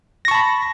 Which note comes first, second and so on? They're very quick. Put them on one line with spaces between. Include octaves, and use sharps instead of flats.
A#6 C#6 A5 B5